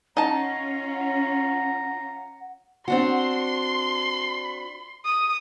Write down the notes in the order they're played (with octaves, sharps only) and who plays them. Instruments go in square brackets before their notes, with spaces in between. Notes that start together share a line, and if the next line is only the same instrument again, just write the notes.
[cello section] C#4 F4 [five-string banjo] D#4 A5 [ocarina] F#5 [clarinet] A#5
[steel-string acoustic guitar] C4 D4 F#4 [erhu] C6
[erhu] D#6